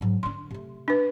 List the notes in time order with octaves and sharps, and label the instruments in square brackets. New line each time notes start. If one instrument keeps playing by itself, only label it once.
[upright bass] G#2 F#3
[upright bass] D3 D4 [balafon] C6
[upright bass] C3 A3
[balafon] D4 B4